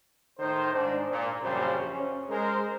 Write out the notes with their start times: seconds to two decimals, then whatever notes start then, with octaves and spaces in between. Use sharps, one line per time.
0.39 A2 D#3 D#4 C5
0.74 G#2 D4
1.10 A#2
1.42 A#1 F#2 C#3 F3 G3 C5
1.91 C#4
2.29 G#3 A#4 C5